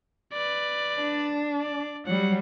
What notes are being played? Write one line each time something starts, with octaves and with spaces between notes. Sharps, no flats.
B4 D5
D4
D5
F#3 G3 F#5